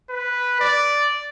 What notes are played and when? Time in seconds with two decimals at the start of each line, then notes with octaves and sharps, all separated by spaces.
0.10 B4
0.60 D5